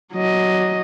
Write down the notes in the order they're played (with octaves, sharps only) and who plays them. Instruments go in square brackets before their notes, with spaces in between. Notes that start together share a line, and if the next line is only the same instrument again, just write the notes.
[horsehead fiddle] F#3 D#5